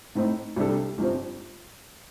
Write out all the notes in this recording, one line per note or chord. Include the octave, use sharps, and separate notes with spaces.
A2 A3 C4 D#4
C2 C3 G3 D4 A4
G1 G2 F3 C4